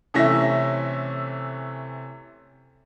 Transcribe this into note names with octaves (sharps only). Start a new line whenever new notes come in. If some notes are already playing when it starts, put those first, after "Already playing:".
C3 E3 A3 C#4 E5 A#6